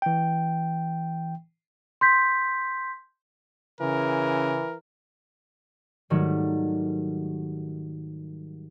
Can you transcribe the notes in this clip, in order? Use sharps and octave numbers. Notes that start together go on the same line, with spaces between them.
E3 G5
C6 G6 B6
C#3 E3 A#4
G#2 D#3 F#3 G3 A3